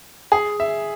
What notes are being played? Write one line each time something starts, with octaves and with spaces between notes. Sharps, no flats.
G#4
E5